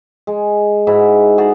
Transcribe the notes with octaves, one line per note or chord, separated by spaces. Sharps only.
G#3
G#2 E4 F#4
D#4 F#4 G#4 A4